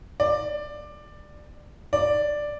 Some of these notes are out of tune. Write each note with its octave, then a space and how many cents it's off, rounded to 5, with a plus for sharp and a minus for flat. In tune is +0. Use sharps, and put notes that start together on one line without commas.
D5 +15
D5 +5